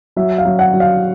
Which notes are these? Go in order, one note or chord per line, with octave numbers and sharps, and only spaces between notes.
F#3 E5
F5
F#3
F#5
F#3
F5